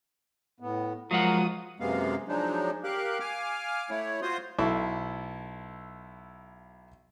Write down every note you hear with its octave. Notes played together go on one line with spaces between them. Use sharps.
A2 B3
F3 F#3 G#3 F#4 A#4 F#5 A#5 D#6
F#2 C3 G#3 A#3 B3 F5
F3 F#3 G#3 D4 D#4
G4 A#4 F5 F#6
F5 G#5 D6 F6
A3 E4 C#5
F4 F#4 C5 C6 D#6
B1 E4 A4